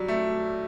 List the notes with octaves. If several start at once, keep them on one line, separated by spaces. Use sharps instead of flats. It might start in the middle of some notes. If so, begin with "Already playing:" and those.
Already playing: F#3 G3
A3